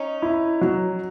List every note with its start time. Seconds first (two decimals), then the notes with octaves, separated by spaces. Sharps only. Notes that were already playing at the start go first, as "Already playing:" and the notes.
Already playing: C#4 D#4
0.22 E4
0.61 F#3